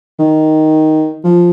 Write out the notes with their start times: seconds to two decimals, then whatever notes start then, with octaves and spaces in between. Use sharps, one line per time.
0.19 D#3
1.24 F3